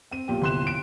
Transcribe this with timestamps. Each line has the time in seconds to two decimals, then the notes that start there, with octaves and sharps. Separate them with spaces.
0.11 C4 D#7
0.28 B1 A#2 G4
0.42 G1 C2 C6 F#6 E7
0.67 D7